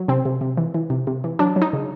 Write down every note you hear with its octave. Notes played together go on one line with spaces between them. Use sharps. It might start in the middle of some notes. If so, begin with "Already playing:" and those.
Already playing: F#3
C3 C4
C3
C3
E3
E3
C3
C3
E3
F#3 D4
F#3
D#4
C#3